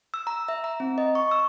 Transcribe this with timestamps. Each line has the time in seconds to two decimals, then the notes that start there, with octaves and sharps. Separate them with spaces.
0.14 E6
0.27 A#5
0.48 E5
0.64 A#5
0.80 C4
0.98 D#5
1.15 C#6
1.31 E6